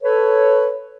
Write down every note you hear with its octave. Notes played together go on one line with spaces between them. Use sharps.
A4 B4 C#5